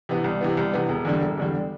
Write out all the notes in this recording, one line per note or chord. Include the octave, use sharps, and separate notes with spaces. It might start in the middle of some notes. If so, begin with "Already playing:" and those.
C3 E3 B3
C2
C3 E3 B3
C2
C3 E3 B3
E1
E2 D3 G3
E1
E2 D3 G3